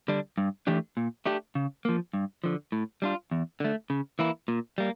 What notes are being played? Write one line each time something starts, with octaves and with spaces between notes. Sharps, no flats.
D3 G3 D4
G2
E3 A3 D4 G4
A#2
A3 D4 G4
C#3
F3 A#3
G2
D3 F3
A2
G3 D4 F4
E2
D3 A3
C#3
E3 A#3 E4
A#2
G3 A#3